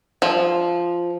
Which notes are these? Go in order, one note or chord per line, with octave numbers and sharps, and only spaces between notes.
F3